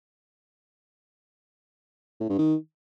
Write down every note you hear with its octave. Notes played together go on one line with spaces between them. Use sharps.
A2
G2
D#3